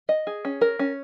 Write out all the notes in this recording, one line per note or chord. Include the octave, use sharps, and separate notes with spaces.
D#5
G#4
C#4
A#4
C#4